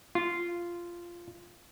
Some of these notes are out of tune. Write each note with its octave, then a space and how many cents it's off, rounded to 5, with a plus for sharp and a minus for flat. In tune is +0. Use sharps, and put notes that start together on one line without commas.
F4 -10